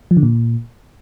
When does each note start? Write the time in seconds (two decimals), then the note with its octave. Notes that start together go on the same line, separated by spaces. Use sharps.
0.11 F3
0.17 D3
0.23 A#2